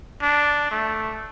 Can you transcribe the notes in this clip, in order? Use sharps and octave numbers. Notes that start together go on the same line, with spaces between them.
D4
A3